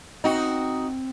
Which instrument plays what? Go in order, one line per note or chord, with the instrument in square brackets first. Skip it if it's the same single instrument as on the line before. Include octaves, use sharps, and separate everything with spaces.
[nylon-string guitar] C4 G5 [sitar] D#4 F#4